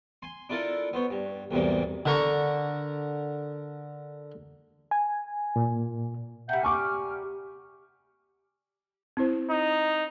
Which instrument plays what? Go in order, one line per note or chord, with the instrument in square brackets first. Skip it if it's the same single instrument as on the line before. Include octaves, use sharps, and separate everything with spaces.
[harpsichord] G#5 C6
D4 E4 F4 A4 A#4
B3 C5 C#5
G2
B1 E2 G#2 C3 G3 A#3
D3 A#4 C#6
[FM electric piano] G#5
[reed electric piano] A#2
[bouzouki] C3 G3 [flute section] E5 F#5 G6
[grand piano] G#5 C#6 D6 [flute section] F6
[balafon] C4 E4 C5
[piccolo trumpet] D#4